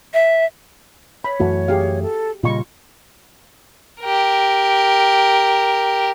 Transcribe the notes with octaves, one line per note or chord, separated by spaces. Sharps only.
E5
C#5 B5
F#2 E3 A3 F#4
G4 G#4 F5
A4
A#2 C#3 G3 F4 D#5 C#6
G4 A#4